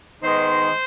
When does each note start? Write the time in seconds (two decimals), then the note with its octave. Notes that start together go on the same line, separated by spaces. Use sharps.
0.23 D#3 G#3 B3 D#4 C5